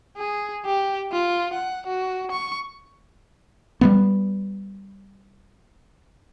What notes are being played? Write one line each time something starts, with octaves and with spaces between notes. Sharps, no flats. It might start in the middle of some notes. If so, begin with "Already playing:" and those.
G#4
G4
F4
F#5
F#4
C#6
G3 A3 B3